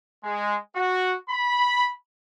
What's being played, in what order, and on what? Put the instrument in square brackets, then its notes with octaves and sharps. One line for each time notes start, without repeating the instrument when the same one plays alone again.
[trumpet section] G#3
F#4
B5